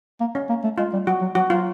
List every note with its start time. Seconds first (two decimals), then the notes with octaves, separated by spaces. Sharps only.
0.20 A#3
0.35 C#4
0.49 A#3
0.64 A3
0.78 G#3 F4
0.93 G3
1.07 F#3 F#4
1.21 F#3
1.35 F#3 F#4
1.50 F#3 F4